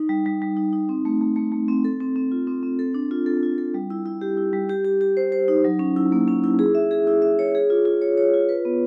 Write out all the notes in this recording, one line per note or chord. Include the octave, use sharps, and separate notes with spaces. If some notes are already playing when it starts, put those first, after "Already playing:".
Already playing: D#4
G3
G3
G3
D#4
D#4
C4
A3
A3
A3
A3
C4
A4
C4
C4
F4
C4
C4
A4
D4
F4
A4
F4
A4
G3
E4
E4
G4
E4
G3
G4
G4
G4
C5
C5
D#4
F#3
C#4
E4
A#3
C#4
E4
G#4
E5
G#4
E4
E5
C#5
G#4
F4
F4
C#5
C#5
F4
B4
B3